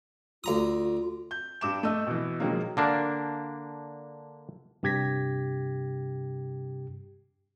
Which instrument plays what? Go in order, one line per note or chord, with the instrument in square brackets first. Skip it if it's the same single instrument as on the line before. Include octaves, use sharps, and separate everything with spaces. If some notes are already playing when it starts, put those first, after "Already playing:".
[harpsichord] D2 A#5 D#6 [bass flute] F4
[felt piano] G6
G2 D6 E7
A3 D#5 E6
B2 E3
B2 D#3 F3 F#3 G#3 A#3
[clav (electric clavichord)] D3 A#3 D4
[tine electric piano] G2 C3 G4 G#6 A#6 B6